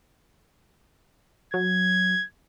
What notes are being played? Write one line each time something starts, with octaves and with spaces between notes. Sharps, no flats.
F#3 G#6